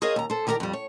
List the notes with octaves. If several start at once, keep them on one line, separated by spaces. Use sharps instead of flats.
G#4 A#4 C5 C#5 D#5 F5
D#2 A#5
A4 C5
D#3 G4 A#4 D5 A#5
F2 G3
C#5